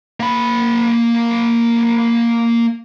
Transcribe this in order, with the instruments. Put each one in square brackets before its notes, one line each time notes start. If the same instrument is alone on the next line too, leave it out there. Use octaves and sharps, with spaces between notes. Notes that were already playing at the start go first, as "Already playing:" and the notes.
[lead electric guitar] A#3 B5